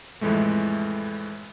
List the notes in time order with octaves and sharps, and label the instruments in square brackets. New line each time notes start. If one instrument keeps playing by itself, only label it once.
[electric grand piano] F2 A2 E3 G#3 A3